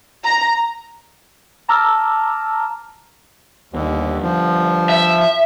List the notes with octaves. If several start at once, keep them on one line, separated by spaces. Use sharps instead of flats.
A#5
A5 A#5 D6 E6 F6
G1 D#2
F3
E5